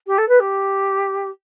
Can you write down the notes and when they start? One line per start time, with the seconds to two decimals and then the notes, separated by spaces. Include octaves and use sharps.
0.07 G4
0.18 A4
0.29 B4
0.40 G4